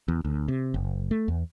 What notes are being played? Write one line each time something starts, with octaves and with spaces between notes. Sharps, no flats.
E2
D2
C3
F#1
A3
E2